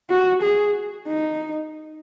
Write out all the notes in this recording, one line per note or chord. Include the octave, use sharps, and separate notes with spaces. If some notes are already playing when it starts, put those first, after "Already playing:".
F#4
G#4
D#4